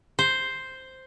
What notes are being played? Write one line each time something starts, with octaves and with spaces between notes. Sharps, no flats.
C5